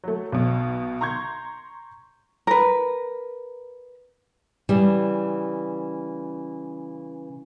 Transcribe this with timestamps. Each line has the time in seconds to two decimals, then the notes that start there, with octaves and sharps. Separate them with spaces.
0.04 F#3 A3
0.32 B1 B2
1.01 A#5 C6 C#6 G6 G#6
2.47 A#4 B4
4.69 C#3 E3 G3